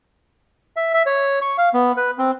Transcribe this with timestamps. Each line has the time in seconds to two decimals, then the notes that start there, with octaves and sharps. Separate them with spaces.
0.76 E5
0.94 E5
1.06 C#5
1.42 C#6
1.58 F5
1.74 B3
1.97 B4
2.18 C4